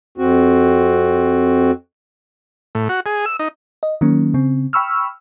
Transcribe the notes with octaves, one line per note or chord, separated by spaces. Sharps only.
F2 C4 F#4
A2
F#4
G#4
E6
D#4
D#5
D#3 F#3 A#3 C#4
C#3 C4
G5 B5 C#6 E6 F6